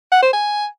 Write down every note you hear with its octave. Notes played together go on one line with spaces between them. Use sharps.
F#5
C5
G#5